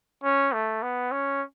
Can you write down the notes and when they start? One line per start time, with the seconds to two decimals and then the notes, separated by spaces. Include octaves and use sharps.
0.24 C#4
0.53 A3
0.83 B3
1.12 C#4